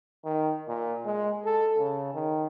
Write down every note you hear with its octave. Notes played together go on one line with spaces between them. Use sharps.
D#3
A#2
G#3
A4
C#3
D#3